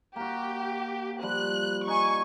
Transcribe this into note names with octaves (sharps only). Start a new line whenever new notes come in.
A#3 F#4 G4
F3 G3 F#6
D#4 G#5 C#6